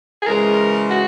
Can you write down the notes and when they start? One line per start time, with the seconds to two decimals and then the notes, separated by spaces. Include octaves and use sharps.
0.22 G#4
0.27 C#3 E3 G#3 A#4
0.90 F#4